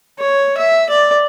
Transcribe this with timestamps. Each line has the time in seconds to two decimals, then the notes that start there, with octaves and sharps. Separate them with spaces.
0.19 C#5
0.58 E5
0.90 D5